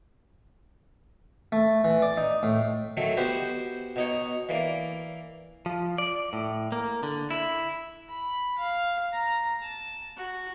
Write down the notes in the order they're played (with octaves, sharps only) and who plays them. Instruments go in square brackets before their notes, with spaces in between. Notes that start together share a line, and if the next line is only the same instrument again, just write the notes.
[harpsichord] A3
E3
D5
D#4
A2
D3 D#3 F#3 A3
B3 F#4 G4 C5
B2 D#4 C#5
E3 A#3 D5
[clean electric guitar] F3
D5
A2
A#3
D3
E4
[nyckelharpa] B5
F5
A#5
A5
F#4